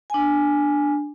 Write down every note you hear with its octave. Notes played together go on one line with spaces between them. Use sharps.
D4 G#5